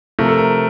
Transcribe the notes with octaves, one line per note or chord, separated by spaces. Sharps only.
C3 F3 A3 A#4
A4
A#4